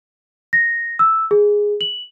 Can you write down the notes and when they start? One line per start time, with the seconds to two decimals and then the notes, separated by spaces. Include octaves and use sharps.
0.53 A#6
0.99 E6
1.31 G#4
1.81 F#7